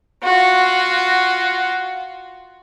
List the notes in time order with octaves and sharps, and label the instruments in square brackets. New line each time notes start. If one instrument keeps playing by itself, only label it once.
[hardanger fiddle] F4 F#4